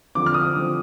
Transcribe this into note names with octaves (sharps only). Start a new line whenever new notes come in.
D3 F3 C4 D6
F6
D#6
D3 F3 C4